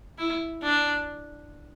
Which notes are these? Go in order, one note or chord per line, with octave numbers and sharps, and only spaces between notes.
E4
D4